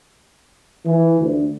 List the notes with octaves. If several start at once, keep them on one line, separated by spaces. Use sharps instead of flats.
E3
D2